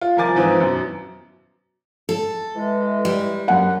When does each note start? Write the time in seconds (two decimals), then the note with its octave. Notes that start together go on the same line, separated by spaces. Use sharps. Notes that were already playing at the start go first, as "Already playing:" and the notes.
0.01 F4
0.17 C2 F3 A#4 G#5 D6 A6
0.36 G#2 E3 F3 C4 D#4
0.60 F#2 B2
2.09 A4
2.56 E3 G#3
3.05 G3
3.48 F#2 F#5